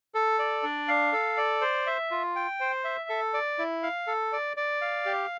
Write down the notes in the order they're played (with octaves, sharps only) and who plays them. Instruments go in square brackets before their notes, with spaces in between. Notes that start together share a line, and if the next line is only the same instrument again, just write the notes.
[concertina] A4
D5
D4
F5
A4
D5
C5
E5
F4
G5
C5
E5
A4
D5
E4
F5
A4
D5
D5
F5
G4